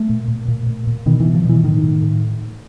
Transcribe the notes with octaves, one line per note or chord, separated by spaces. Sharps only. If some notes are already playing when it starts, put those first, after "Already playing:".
Already playing: A3
A#2
A#2
A#2
A#2
A#2
B2 D#3
B2 E3
F3
B2 E3
A2 D#3
A2
A2